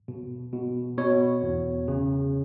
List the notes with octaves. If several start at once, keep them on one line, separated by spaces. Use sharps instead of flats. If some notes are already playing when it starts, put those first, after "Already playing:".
B2
B2
B2 C#5
E2
C#3